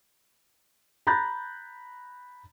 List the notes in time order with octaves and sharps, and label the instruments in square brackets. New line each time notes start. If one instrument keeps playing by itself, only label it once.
[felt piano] A#5 B5 F#6 G6 A6 A#6